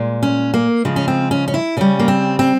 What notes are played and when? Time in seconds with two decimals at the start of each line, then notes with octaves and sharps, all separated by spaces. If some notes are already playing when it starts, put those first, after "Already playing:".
Already playing: A#2 G#3
0.23 C#4
0.54 A#3
0.85 C#3 F3 G#3
0.96 C#4
1.08 C4
1.31 C#4
1.48 C#4
1.54 E4
1.77 C#3 G3 C#4
1.99 A#3
2.08 C4
2.39 C4